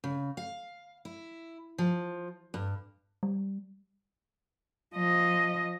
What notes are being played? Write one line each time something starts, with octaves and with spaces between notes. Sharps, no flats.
C#3
F5
E4
F3
G2
G3
F3 D#5